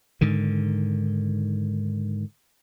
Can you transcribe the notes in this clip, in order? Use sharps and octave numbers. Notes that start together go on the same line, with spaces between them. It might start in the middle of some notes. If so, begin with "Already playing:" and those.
G#2 D3 D#3